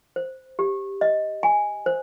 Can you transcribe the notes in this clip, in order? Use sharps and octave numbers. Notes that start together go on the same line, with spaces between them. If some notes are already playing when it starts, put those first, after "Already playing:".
C5
G4
D#5
G#5
C5